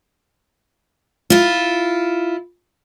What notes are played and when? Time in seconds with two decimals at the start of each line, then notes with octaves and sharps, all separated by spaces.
1.30 E4 F4